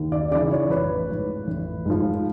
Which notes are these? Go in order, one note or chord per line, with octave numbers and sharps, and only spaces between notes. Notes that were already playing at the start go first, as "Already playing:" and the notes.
Already playing: D#2
D5
C#3 E3 D5
C#5
A1 B4
G#2 F3
A1
G#2 F3